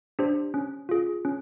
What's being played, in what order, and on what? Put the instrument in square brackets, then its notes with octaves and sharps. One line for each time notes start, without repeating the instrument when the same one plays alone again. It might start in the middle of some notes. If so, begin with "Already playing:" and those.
[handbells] D4 G4 C5
C#4
F4 G#4
C#4